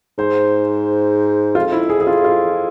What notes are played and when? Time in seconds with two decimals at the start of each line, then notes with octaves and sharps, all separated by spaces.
0.18 G#2 C5
1.55 F2 F4
1.72 E4
1.90 G#4
2.01 G#4
2.07 F4
2.24 F4